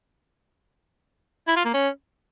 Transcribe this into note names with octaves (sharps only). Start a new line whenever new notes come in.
E4
F4
A#3
C#4